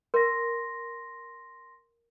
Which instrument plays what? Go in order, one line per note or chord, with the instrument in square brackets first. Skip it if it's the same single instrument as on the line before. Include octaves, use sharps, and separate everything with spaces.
[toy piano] A#4 [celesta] C6 A#6